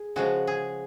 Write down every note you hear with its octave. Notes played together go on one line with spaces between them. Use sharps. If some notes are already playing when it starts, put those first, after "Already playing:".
Already playing: G#4
C#3 F3 G#3 F#4
G#4